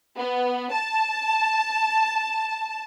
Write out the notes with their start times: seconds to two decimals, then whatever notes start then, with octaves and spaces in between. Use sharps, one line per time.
0.18 B3
0.71 A5